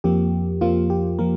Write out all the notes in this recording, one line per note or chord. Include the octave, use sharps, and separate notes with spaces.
F2 F3 A#3 G4
F2 F3 A#3 F4
G4
F3 A#3 A#4